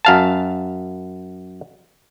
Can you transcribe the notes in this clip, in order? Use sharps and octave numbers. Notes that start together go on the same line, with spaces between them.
F#2 F5 A5